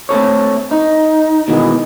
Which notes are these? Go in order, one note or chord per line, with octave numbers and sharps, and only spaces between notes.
A3 C4 A4 C#5
D#4
B2 D#3 E3 G#3